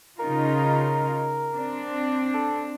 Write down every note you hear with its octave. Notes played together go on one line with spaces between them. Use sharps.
C#3 D#4 F4 A#4
C4 D4
A4